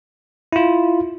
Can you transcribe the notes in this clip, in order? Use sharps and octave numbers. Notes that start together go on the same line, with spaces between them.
E4 F4